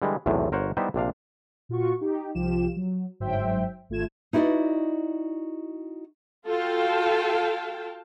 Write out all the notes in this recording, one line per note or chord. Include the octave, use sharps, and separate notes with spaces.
D3 E3 G3 G#3
B1 E2 A2 C3
G1 A#4 C5 C#5 F#5
G3 B3 D#4 E4 G4 C5
A#1 C3 D4 F5
A#2 F4 F#4 C#6
D#4 G4
C2 F3 F4 G4 E7
F#3
G1 G#2 F#3 C5 E5 G5
G#1 A3 F4 G#6 E7
D#4 E4 F#4 C5 D5 D#5
F4 F#4 A4 F5 G5 A5